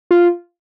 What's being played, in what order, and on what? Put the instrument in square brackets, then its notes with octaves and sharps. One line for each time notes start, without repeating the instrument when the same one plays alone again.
[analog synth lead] F4